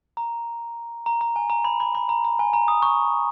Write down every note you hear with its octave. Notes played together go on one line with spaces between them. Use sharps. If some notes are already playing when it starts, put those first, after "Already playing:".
A#5
A#5
A#5
G#5
A#5
B5
B5
B5
A#5
A#5
G#5
A#5
D#6
C#6